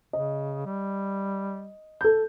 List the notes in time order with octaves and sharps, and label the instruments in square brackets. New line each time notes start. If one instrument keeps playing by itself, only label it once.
[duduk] C#3 [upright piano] D#5
[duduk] G3
[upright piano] A4 G6